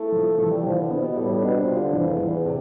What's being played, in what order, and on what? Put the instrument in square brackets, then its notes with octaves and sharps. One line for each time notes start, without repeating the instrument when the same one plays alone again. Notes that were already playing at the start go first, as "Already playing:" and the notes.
Already playing: [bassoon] A3 [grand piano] E4
[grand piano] F3
[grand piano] E3 [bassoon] A3
[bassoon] G3
[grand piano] E3 [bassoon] F3
[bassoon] D3
[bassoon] C3 [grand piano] B3
[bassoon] B2
[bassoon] A2 [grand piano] G3
[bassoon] A2
[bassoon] B2 [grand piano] D4
[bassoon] C3
[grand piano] F4
[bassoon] D3
[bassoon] F2 [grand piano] E3
[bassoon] E2
[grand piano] E3
[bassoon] E2
[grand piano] C3